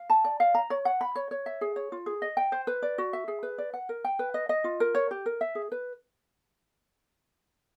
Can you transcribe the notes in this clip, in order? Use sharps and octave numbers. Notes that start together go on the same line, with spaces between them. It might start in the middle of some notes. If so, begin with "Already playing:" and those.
Already playing: F5
A5
D5
F5
A#5
C#5
F#5
B5
C#5
C#5
E5
G#4
C#5
F4
G#4
D#5
G5
C5
B4
D5
F#4
E5
G#4
B4
D5
F#5
A#4
G5
B4
D#5
D#5
F4
A#4
C#5
G4
A#4
E5
G#4
B4